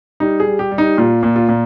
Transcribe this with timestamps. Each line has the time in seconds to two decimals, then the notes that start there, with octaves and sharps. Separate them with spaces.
0.20 G3 D#4
0.40 G#4
0.47 G3
0.59 G4
0.72 G3
0.78 D#4
0.97 A#2 F4
1.23 A#2
1.36 F4
1.48 A#2